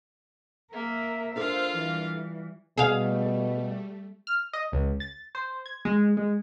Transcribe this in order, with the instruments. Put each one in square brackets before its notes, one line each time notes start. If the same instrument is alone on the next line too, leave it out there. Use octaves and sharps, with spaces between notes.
[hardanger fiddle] A#3 [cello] A#4 E5
[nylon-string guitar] D4 A4 A#4 [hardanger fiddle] F4 F5 [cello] C5
[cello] E3 G3
[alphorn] B2 [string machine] G3 A3 [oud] G#4 F5
[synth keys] F6
D#5
C#2
A6
C5
G#6
G#3
G#3